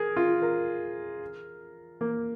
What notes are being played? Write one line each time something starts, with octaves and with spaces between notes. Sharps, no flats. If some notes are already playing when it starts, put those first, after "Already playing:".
Already playing: G#4 A#4
F4
A#4
A#3